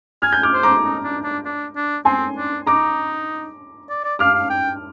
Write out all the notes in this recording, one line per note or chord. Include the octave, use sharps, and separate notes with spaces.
G#5 F6 G#6
G6
D6 F6
C5
A#5 D6
D#4
D4
D4
D4
D4
C4 G#5 C6
D4
D#4 A#5 D6
D5
D5
F5 D6 F6
F5
G5